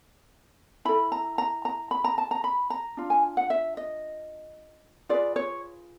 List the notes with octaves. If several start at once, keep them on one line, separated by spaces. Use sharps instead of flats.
E4 A4 B5
A#5
A#5
A#5
B5
A#5
A5
A#5
B5
A#5
D4 F4
G#5
F#5
E5
D#5
F4 G#4 B4 D5
C#5